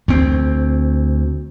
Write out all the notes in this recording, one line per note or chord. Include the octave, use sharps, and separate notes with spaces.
D2 C4